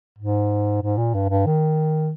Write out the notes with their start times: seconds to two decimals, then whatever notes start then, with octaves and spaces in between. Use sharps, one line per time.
0.19 G#2
0.82 G#2
0.98 A#2
1.14 G2
1.29 G2
1.46 D#3